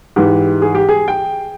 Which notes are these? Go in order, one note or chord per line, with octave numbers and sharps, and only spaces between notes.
G#2 E3 G4
G#4
G4
G#4
G5